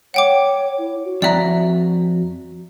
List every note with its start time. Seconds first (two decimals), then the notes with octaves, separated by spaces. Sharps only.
0.14 C#5 F#5 G5 D6
0.78 E4
1.05 F#4
1.22 F2 D5 E5 F#5 A#5